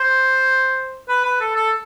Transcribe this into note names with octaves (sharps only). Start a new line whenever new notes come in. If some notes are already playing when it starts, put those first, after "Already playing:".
Already playing: C5
B4
B4
A4
A4